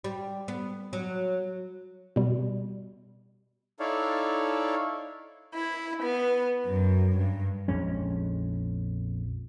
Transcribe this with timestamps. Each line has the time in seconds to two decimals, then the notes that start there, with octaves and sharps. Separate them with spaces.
0.04 G3
0.48 B3
0.93 F#3
2.16 B2 G3
3.80 D#4 E4 A4 C#5 D5 F5
5.54 E4
6.02 B3
6.65 F#2
7.17 G2
7.68 A#1 F2 G#3 C#4